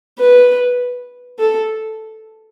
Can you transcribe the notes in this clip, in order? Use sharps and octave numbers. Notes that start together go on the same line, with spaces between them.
B4
A4